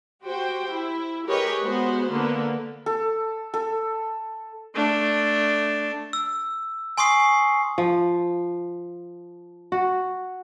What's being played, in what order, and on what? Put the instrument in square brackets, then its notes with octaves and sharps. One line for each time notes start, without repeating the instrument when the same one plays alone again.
[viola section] F#4 G4 C5 G5
E4
G4 G#4 A#4 B4 C#5 D#5
G#3 B3 F#4 C5
D3 A#3 B3
[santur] A4
A4
[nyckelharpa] A3 D4
[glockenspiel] E6
G#5 C6 C#6 D#6 C7
[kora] F3
F#4